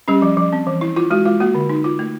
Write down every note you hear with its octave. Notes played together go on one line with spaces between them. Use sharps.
G3 C#4 G4
F3
F3
C4
E3
E4
E4 F4
G#3 F#4
G#3 F4
A#3 F#4
D3
D#4
F4
A3